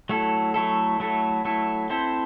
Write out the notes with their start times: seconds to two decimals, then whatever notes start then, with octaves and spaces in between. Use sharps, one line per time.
0.09 F#3 A3 E4 A4
0.54 F#3 A3 E4 A4
1.00 F#3 A3 E4 A4
1.45 F#3 A3 E4 A4
1.90 C4 E4 A4 C5